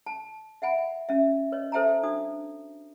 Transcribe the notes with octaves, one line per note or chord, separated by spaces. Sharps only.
A5
E5 F#5 G#5 B5
C#4 E5
B4 C#5 D#5
A4 C5 E5 G5 A5 A#5
D4 F#4 D#6